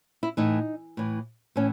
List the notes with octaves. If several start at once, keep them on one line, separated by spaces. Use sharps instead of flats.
E4
A2 E3 D#4
A2 E3
A2 E3 C#4